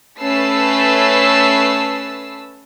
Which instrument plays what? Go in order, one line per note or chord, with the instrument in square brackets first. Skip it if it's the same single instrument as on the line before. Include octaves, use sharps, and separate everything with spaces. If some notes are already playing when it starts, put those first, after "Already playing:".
[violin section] A3 C#4 B4 A5 E6 C7